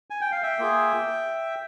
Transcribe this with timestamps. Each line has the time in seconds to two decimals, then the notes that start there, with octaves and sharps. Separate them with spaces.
0.10 G#5
0.21 G5
0.32 F5
0.42 E5 G5
0.59 A#3 F4 G#4